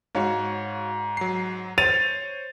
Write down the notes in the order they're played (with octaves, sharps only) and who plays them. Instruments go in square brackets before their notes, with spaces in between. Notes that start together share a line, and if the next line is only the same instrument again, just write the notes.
[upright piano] G#2 [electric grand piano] F#4 C#5 F5
[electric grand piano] F#3 C7
[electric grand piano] C5 C#5 [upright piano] A6 D#7 F7